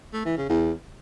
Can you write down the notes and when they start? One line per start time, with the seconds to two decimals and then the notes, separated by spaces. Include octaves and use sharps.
0.13 A3
0.25 E3
0.37 C#3
0.49 E2